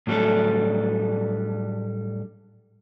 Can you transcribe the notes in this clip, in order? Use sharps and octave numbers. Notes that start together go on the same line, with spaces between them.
A2 F#3 G3 A3 D4 A4